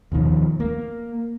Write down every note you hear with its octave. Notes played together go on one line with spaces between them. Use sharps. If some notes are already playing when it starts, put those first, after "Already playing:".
D#2 B2 D#3 F3
A#3